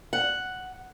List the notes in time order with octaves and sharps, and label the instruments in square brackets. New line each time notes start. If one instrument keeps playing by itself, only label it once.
[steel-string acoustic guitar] F#5